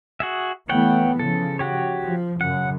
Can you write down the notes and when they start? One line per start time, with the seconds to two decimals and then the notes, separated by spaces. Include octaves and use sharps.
0.20 F#4 G#4 E5
0.69 E3 A3 B3 C#5 F#5 G5
1.19 C#3 F3 A4
1.59 F#4 G4 C#5
2.03 F3
2.41 F#2 C#3 F#5